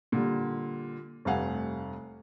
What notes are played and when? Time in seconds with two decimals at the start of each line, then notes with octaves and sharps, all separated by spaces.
0.12 A#2 D3 G3
1.25 F1 G2 A3 F5 F#5 G#5